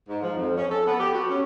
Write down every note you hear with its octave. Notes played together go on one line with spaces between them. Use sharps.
G#2
F3
F2
C#4
A4
B3
G4
F#4
C#4